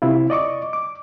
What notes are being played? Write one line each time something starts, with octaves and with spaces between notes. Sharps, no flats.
C3 E4 F4
D5 D#5 C#6 D6
D6